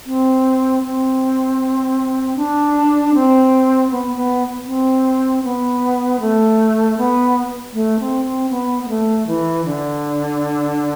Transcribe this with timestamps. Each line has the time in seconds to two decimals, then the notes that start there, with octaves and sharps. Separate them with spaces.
0.06 C4
0.83 C4
2.36 D4
3.14 C4
3.91 B3
4.16 B3
4.66 C4
5.44 B3
6.20 A3
6.97 B3
7.73 A3
8.00 C4
8.25 C4
8.50 B3
8.83 B3
8.89 A3
9.27 E3
9.65 D3